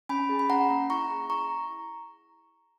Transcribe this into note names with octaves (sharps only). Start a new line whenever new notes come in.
C#4 G#5 B5
G#4
B5
C#4 F#5 A#5
A#3
E4 A#5 C#6
G#4
E4 A#5 C#6